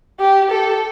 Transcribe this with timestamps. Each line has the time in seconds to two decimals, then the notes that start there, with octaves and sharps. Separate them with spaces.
0.20 G4
0.51 A4